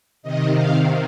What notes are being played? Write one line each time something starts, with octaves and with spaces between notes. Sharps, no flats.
C3 D#3 D#5
F5